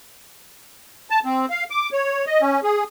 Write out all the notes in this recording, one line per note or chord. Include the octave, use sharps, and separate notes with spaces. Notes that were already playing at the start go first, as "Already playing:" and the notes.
A5
C4
F5
D6
C#5
D#5
C#4
G#4